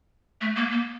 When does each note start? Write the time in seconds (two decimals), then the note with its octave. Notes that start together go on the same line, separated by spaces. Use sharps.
0.41 A3
0.56 A#3
0.71 A#3